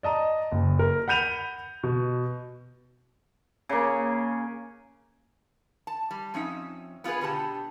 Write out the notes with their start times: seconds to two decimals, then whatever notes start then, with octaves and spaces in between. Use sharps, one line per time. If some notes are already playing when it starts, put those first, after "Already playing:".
0.03 D5 D#5 A5 A#5
0.52 F#1
0.79 A#4
1.08 F#5 B5 G6 D#7 F7
1.83 B2
3.69 C#3 A#3
5.87 A5
6.11 G3
6.34 F2 C#4 D#4 E5
7.04 B3 F4 F#4 G#4 B4
7.21 B2 D3 B3 G4 A5